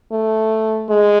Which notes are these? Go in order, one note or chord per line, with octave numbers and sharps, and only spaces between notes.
A3
G#3